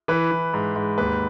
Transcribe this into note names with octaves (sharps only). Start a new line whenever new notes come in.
E3 B4
E3
G#2
G#2
D#2 B4